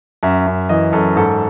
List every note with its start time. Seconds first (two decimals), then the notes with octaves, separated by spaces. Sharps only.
0.23 F#2 E5
0.47 F#2
0.69 E3 D#5
0.93 F#2 A4
1.16 G#2 A4